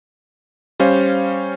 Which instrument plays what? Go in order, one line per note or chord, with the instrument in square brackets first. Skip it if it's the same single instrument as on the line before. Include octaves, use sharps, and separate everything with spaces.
[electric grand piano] G3 C#4 C5 F5